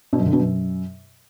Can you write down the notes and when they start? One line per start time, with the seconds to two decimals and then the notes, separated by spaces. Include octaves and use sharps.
0.13 B2
0.19 F#2
0.26 D3
0.33 B2
0.39 F#2